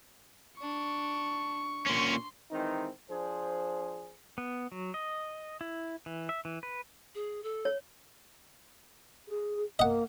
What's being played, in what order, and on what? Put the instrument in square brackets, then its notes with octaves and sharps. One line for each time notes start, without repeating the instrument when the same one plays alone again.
[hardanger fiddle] D4 [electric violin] C#6
[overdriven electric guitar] A#2 C#4 [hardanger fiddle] C6
[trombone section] D#3 E3 G#3 C4 D#4
F3 D4 G#4 C5
[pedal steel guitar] B3
F#3
D#5
E4
E3
E5
E3
B4
[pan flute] G#4
A4
[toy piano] C#5
[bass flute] G#4
[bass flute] A#3 [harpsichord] D#5 F#5